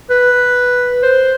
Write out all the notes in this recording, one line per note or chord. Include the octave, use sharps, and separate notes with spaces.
B4
C5